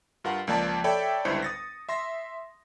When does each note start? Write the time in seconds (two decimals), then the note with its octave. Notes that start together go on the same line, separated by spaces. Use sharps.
0.24 G2 F4 A#4 F#5
0.47 C#2 F3 A#3 D5 A5
0.84 A4 C#5 D5 E5 G5 B5
1.25 G1 C#2 G2 E4 C5 C#7
1.42 D#6 A6 A#6
1.89 E5 C6 A#6